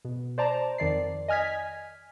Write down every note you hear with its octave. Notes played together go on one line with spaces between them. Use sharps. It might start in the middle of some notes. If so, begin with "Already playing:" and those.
B2
C5 D5 A5 A#5
F2 D#3 D5 C7
D#5 G#5 F6 G#6 B6